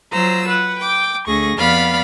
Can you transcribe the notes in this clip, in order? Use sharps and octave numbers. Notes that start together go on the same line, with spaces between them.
F#3 F4 C5 A#5 E6
B4 F#5
G5 D6
D2 G#4 C#6 A#6
F2 B3 D5 F5 B5 F6